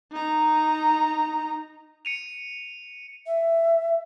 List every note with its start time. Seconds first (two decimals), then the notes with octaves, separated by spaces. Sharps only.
0.12 D#4 A#5
2.05 C#7 D#7 F7
3.27 E5